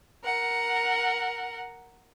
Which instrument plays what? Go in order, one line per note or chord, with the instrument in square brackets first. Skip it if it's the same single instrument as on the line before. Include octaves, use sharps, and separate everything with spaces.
[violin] A#4 F#5